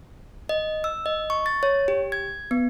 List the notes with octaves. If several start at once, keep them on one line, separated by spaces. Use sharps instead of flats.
D#5
E6
D#5
C#6
A6
C#5
G4
G#6
B3